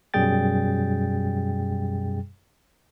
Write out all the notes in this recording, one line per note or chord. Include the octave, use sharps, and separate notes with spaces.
F#2 B2 G3 G#4 G5 A6